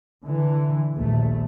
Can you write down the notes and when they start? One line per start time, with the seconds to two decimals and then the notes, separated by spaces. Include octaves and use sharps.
0.23 D3 E3
0.95 A#1 D#2 A3